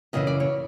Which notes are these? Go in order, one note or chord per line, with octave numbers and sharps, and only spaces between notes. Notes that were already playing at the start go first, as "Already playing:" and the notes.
F#2 C#3 E3 D#5
D5
C#5